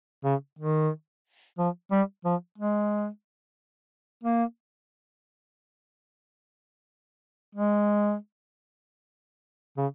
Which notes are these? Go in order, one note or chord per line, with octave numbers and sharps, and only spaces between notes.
C#3
D#3
F3
G3
F3
G#3
A#3
G#3
C#3